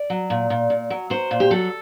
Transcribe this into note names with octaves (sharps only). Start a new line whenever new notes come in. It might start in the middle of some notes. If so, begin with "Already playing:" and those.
Already playing: D5
F#3
A#2
A#2
A#2
F#3
F#3 C5
A#2
G4
F#3 A4